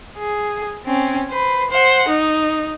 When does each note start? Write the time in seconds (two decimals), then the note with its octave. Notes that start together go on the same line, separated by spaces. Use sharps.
0.17 G#4
0.85 C4 C#4
1.29 B4 C5
1.70 C5 F#5
2.08 D#4